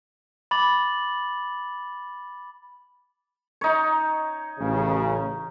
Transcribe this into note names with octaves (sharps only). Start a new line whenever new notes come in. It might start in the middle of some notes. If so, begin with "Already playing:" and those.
B5 D6 A6 F#7
D#4 C#5
A1 C#3